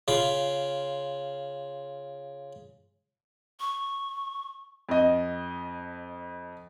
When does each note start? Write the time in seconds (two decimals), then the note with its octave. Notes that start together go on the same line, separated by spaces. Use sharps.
0.08 C#3 F4 B5
3.60 C#6
4.89 F2 D#5